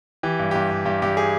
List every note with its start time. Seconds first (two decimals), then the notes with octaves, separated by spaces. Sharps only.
0.23 E3 G4
0.39 G2
0.51 G2 G4
0.71 G2
0.85 G2 G4
1.02 G2 G4
1.17 G#4